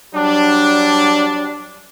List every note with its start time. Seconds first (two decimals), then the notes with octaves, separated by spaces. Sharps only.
0.14 F#3 G3 D4